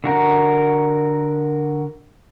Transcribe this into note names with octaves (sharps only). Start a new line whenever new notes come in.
D3 F#4 A#4